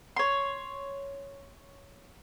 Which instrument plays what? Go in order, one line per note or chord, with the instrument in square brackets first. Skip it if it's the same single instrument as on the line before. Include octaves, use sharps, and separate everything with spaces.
[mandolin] C#5 C6